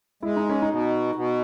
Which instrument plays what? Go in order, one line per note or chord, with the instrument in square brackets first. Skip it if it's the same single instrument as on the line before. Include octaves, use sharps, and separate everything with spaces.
[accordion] G#3 [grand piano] E4
[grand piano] D#4
C#4
D#4
[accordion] B2
B2